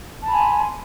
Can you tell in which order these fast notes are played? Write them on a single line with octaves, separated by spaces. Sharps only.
A5 B5 G#5 C6